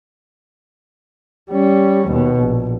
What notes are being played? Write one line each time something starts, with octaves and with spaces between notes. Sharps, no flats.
G3 C#4
D#2 B2
A#1